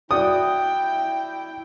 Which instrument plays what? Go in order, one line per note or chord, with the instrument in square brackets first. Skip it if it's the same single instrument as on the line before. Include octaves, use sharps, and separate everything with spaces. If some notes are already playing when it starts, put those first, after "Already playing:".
[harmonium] E4 [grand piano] F#4 D5 [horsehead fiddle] G5 [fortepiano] D#6